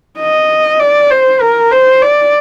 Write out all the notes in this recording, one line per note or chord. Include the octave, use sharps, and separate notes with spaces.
D#5
D5
C5
A#4
C5
D5